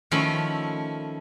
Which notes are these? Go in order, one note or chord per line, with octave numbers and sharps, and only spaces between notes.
D#3 F3 A3 C#4 E4